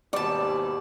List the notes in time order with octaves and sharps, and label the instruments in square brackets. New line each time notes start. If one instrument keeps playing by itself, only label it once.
[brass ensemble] D#2 G#2 B2 [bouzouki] G3 A5 [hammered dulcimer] D5